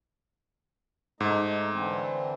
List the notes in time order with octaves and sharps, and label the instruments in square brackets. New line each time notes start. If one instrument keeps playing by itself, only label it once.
[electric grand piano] G#2 [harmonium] A3 D#4 D#5
[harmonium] D3 E3 C4